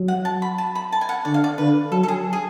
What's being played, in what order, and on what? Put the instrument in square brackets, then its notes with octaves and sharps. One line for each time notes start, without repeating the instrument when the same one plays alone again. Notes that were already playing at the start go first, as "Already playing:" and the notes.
Already playing: [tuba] F#3
[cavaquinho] F#5
A5
B5
A5
B5
A5
G#5
F#5
[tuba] D3 [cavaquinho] D5
[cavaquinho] F5
D5
[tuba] D3 [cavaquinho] B4
[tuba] F#3 [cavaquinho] A4
[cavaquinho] A4
G#4
G#4